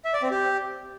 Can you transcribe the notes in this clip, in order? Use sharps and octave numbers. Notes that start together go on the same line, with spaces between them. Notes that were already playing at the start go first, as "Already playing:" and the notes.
E5
D5
C4
G4